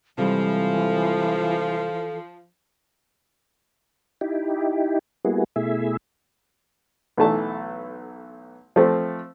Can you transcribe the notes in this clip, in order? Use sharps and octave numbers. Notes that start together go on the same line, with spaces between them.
C3 E3 F3 G3 G#3 A4
D#4 E4 G4
G3 A#3 B3 E4 F#4 G#4
B2 A3 E4 G#4 E5
B1 E3 A3 A5
F3 A3 C4